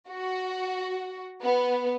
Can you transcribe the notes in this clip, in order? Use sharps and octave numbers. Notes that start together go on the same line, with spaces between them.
F#4
B3